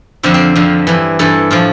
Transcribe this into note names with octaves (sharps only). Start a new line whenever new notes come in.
F2 D3 F3 C4
C4
F2 D3 F3
G2 E3
G2 E3 A4
A2 F3 F4